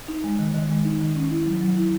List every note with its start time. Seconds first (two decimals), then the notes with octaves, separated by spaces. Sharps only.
0.08 D#4
0.24 G#3
0.39 D#3
0.54 D#3
0.70 G#3
0.85 D#4
1.01 D#3
1.16 C#4
1.31 E4
1.46 F#3
1.61 F#3
1.77 E4